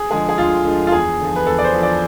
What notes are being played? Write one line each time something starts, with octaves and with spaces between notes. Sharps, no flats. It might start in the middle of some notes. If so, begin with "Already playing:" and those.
Already playing: G#4
D3 F3 G#3 G#4
G#4
D2 F4
D3 F3 G#3
F4
E2 G#4
D3 F3
B4
E2 A4
D5
C5
D3 F3
D5